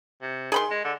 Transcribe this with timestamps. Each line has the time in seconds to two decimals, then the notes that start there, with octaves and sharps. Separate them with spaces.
0.22 C3
0.52 D#3 G#4 B5 C6
0.71 G#3
0.84 D3